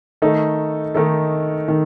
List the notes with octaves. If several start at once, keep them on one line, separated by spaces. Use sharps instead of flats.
D#3 A3 D#4 A4
D#3 A3 D#4 A4
D#3